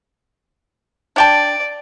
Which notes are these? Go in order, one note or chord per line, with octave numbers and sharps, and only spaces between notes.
D4 D5 G5 A5